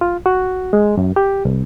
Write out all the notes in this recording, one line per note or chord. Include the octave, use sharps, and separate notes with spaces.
F4
F#4
G#3
F#2
G4
C2